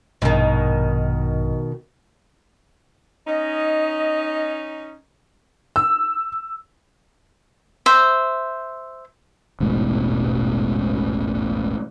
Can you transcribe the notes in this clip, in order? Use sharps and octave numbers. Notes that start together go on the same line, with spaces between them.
A#1 G2 B2 D#3
C#4 D#4 D#5
E6
C5 E5
E1 A1 G#2 B2